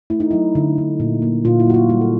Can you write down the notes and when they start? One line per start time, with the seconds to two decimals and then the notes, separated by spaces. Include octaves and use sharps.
0.10 A3 E4
0.20 D#4
0.31 F#3 E4
0.55 D3
0.78 D3
1.00 A#2
1.22 A#3
1.45 A#2 F4
1.60 E4
1.67 F#3 F#4
1.74 F4
1.89 G3 F#4
2.01 A4